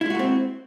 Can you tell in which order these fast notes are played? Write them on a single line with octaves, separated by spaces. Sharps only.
E4 G#3 F#4 A3 C4